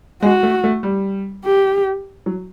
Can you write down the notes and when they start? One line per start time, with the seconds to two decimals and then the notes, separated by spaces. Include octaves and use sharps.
0.22 G#3 F#4
0.43 A3
0.64 A3
0.83 G3
1.45 G4
2.26 F#3